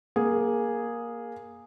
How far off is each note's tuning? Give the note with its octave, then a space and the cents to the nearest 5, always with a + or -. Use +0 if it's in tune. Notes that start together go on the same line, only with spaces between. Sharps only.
A#3 +10 G#4 -5